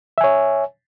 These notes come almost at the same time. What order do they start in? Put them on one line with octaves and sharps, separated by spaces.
E5 G#5 C#5